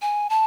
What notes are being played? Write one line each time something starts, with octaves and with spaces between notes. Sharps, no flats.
G#5
A5